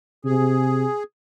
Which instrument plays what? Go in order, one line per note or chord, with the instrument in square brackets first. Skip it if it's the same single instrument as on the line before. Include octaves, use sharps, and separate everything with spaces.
[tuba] C3 [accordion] G#4